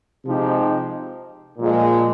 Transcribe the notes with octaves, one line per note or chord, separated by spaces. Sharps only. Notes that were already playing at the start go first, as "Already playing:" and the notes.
C3 F3 G#3 D#4 G4
A#2 F3 G#3